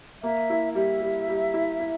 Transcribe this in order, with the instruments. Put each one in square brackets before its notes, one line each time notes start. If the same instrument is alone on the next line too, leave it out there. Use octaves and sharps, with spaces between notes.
[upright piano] A#3 [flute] E5
[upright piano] E4
[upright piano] G3 [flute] E5
[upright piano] G3
G3
E4
E4